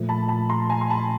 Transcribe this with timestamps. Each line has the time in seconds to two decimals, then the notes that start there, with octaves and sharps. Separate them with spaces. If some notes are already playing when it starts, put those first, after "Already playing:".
Already playing: A#2 F3 A3
0.09 A5 B5
0.28 A5 B5
0.49 A#5 C6
0.70 G#5 A#5
0.81 C6
0.90 A5 B5